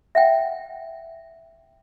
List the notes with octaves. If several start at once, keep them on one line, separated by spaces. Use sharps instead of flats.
E5 F#5 G5